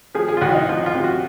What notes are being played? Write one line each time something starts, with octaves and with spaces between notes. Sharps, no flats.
F3 G#4
G#4
F4
C2 F#4
D#4
F3 F4
F4
C3
F#4